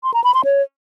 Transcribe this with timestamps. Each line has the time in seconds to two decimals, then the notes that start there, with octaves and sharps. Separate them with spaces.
0.04 C6
0.14 A#5
0.24 B5
0.34 C6
0.45 C#5